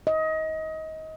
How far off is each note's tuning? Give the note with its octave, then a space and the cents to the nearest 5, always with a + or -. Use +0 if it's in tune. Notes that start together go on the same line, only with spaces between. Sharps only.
D#5 +25